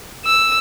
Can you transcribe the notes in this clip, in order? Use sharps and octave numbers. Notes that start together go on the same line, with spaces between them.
E6